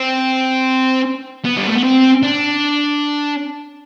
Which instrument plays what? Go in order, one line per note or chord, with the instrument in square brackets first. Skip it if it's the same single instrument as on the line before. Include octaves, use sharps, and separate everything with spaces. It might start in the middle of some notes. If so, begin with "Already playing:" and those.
Already playing: [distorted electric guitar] C4
B3
G3
A3
B3
C4
D4